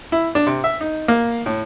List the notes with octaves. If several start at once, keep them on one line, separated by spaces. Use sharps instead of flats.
E4
D4
C3
E5
D#4
A#3
A2